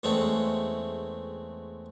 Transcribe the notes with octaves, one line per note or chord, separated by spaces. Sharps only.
E2 G#3 A3 C4 C#4